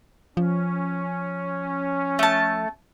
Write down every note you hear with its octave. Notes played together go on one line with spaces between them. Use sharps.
F3 C#4
A3 A5